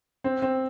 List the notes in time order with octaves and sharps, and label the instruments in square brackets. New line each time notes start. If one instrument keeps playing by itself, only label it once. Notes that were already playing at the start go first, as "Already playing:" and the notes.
[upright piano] C4
C4